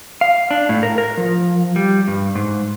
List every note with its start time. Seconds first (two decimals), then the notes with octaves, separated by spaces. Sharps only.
0.21 F5
0.51 D4
0.69 A2
0.83 A#4
0.98 A#4
1.17 F3
1.76 G3
2.08 G2
2.35 G#2